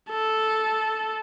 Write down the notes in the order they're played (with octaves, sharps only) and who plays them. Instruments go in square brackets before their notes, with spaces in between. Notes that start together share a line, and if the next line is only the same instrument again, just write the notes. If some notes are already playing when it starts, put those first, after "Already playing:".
[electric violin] A4